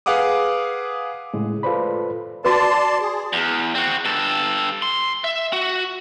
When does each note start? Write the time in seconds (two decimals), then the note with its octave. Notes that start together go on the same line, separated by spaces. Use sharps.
0.06 G#4 B4 F5 F#5 D6 D#6
1.34 A2 C#3 G#3
1.63 F4 A4 B4 C5 D5 B5
2.45 F#4 B4 D5 A5 C6
3.00 G#4
3.33 E2
3.75 C4 F#4
4.05 G2 A4
4.82 C6
5.24 E5
5.53 F#4